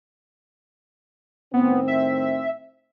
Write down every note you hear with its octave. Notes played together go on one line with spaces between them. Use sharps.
A2 D#3 B3 C4
E5